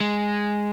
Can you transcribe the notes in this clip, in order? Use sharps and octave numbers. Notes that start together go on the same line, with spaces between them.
G#3